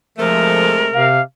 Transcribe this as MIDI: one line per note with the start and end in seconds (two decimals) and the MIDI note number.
0.18 0.92 48
0.18 0.78 53
0.18 0.92 56
0.18 0.92 57
0.18 1.07 70
0.94 1.20 48
0.94 1.22 77